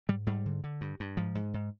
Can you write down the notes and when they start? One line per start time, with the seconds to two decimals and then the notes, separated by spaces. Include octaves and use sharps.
0.09 G#2 G3
0.26 G#2 G3
0.46 D3
0.64 D3
0.81 G2
1.00 G2
1.17 G#2 F3
1.35 G#2
1.54 G#2